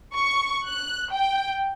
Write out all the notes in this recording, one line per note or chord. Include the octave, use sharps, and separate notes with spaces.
C#6
F#6
G5